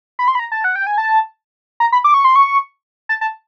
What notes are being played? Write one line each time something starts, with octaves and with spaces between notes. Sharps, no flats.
B5
C6
B5
A#5
A5
F#5
G5
G#5
A5
A#5
B5
D6
C#6
C6
C#6
A5
A5